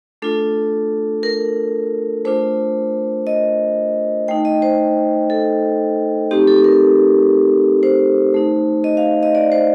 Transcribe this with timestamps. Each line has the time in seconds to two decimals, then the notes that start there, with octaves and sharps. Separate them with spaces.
0.22 A3 D4 F4 A4
1.23 A#4
2.25 A3 D4 F4 C5
3.27 D#5
4.28 A3 D#4 G5
4.45 D#5
4.62 C5
5.30 A4
6.31 A3 C4 D#4 G4
6.47 A4
6.64 A#4
7.83 C5
8.34 A3 D#4
8.84 D#5
8.97 F5
9.23 D#5
9.35 D5
9.52 C5